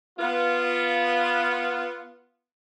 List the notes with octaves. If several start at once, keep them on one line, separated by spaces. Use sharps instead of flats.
B3 F4